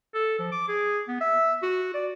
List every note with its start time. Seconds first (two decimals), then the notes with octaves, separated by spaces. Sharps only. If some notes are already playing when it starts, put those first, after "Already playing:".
0.14 A4
0.39 F3
0.52 D6
0.68 G#4
1.08 B3
1.21 E5
1.62 F#4
1.94 D5